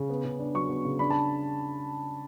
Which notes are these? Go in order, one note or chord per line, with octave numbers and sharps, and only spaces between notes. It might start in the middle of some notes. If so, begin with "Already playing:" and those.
Already playing: C#3
B3
C#3
D4
F#3 C#6
B3
C#3
D4 B5
A5